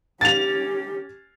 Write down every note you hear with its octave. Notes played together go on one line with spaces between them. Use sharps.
C#4 G4 A6 F7